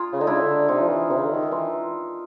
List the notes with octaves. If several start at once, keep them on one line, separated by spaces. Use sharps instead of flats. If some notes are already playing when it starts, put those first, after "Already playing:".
Already playing: F4 G#4 A#4
C#3
D3 D#4
C#3 D4 E4
D3
C3 D#4 F4
F3
E3
C3 D4 E4
C#3
D3
D#3 D#4
E4
E3 D#4 F4